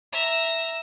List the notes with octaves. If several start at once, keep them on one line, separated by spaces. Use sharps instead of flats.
E5 A#5